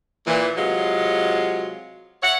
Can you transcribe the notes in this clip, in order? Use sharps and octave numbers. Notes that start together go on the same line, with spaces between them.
A#2 E3
C3 F#3 G#3 F4
C#5 E5 F#5